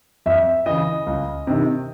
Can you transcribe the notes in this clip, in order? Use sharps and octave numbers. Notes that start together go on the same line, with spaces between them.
F2 E5
C#3 E3 D#5
C#2
C3 D#3